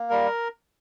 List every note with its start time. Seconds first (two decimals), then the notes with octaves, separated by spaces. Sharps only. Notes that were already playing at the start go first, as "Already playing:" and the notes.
Already playing: A#3
0.10 G3 A#4